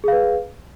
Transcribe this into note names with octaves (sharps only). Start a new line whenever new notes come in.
G#4 B4 F5